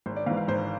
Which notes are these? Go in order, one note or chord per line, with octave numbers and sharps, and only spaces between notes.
G#1 C5
D5
G#2 E3 F5
F5
G#1 C5